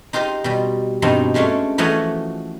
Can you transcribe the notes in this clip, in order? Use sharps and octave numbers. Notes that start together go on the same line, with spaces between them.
D#4 F4 G4 C5 D#5
B2 G3
G2 B2 F3 C4 D#4
F3 G#3 A3 C#4 D4
E3 F3 A3 F#4 C#5 D#5